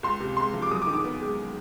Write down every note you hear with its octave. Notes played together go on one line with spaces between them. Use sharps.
C#2 C6
C3
G#3 C6
F3
D6
F#2 D#6
D6
D#3
D6
B3
G#3